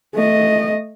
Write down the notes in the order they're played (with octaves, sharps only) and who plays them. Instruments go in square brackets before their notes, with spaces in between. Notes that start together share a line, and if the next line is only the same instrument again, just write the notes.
[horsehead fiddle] A3 D#5